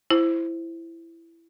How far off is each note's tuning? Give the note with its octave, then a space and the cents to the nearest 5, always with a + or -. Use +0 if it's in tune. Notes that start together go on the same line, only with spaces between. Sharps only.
E4 +10 C5 +0